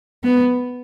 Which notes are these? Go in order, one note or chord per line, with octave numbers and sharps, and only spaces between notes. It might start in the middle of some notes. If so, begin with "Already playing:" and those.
B3